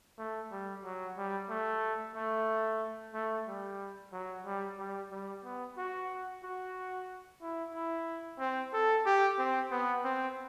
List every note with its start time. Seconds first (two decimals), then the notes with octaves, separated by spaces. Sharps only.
0.18 A3
0.51 G3
0.84 F#3
1.17 G3
1.49 A3
2.15 A3
3.14 A3
3.47 G3
4.12 F#3
4.45 G3
4.78 G3
5.11 G3
5.44 B3
5.78 F#4
6.43 F#4
7.42 E4
7.74 E4
8.39 C4
8.73 A4
9.06 G4
9.38 C4
9.71 B3
10.04 C4